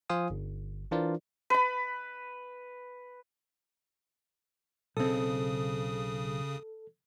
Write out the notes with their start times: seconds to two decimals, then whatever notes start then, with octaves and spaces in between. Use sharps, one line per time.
0.10 F3 F4 C5 F5 G#5 D#6
0.30 G1
0.91 E3 D4 F4 A#4 C5 D5
1.50 B4 B5
4.97 B1 C#3 C4 A4 D#6